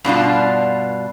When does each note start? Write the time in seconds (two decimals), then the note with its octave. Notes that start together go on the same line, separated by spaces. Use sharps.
0.04 G2 B2 D4 F4